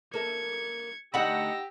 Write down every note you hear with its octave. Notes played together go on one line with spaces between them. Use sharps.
A#3 A4 E5 G#6 C#7
D3 A3 D#4 G4 F#5 B5 E6 A#6